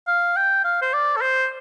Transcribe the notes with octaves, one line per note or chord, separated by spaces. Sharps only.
F5
G5
F5
C5
D5
A4
C5